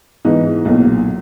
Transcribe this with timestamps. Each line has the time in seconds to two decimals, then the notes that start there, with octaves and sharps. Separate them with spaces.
0.25 G#2 E3 B3 D#4
0.65 B1 A#2 F#3